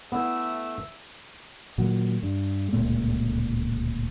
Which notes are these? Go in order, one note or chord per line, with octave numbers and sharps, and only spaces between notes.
A3 B3 E4 E5
A#2 D#3 F3 F#3
G2
D1 C#2 A#2 A3